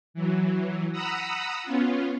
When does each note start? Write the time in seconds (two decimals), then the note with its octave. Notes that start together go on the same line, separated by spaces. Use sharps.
0.14 E3 F#3
0.92 F#5 A#5 B5 D#6 E6
1.63 B3 C#4 F4